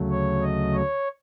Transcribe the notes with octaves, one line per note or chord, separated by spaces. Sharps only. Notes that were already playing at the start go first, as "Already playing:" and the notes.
Already playing: D2 C#3 F#3 A3
C#5
D#5
C#5